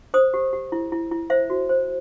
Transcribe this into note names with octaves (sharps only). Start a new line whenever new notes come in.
C5 D#6
G4
G4
E4
E4
E4
C5 E5
F#4
C5